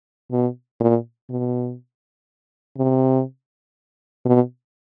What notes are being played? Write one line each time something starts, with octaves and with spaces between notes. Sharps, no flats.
B2
A#2
B2
C3
B2